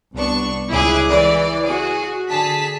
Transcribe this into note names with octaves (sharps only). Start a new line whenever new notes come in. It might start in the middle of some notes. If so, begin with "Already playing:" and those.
C2 B3 D4 C#6
C#2 E4 G#4 D6 F#6
E3 D5
F#4 G#4
D3 G#4 A5 B6